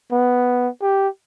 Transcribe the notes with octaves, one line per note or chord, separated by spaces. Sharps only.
B3
G4